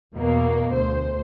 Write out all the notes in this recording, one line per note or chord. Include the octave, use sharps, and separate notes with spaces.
E2 B2 A#3
D2 C5